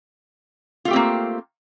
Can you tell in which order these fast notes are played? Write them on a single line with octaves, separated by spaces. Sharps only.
F4 A3 G4 C4 A#3